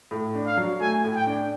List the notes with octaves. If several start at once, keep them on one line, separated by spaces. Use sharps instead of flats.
A2
D4
F5
F#3
A3 G#5
A2
G5
D4